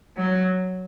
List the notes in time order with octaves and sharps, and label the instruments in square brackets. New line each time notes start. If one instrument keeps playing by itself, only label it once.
[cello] F#3